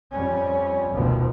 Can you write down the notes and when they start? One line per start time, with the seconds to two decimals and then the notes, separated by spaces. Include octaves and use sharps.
0.12 F2 G3 C#4
0.93 F1 D2 B2 D#3 F3